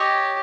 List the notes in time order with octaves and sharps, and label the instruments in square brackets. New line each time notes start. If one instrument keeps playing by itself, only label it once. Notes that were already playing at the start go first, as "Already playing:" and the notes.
Already playing: [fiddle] G4 [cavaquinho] C#5 D#5